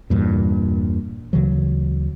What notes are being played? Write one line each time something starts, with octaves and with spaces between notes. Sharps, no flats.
E2 G2 A#2
D2 C#3 E3 F#3